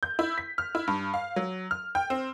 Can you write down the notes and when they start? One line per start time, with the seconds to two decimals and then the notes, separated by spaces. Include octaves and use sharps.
0.03 G6
0.19 E4
0.38 B6
0.58 F6
0.75 E4
0.88 G2
1.14 F5
1.36 F#3
1.71 F6
1.95 G5
2.10 C4